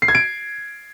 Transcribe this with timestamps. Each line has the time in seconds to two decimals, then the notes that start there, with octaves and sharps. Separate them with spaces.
0.02 C7
0.08 G#6
0.15 D7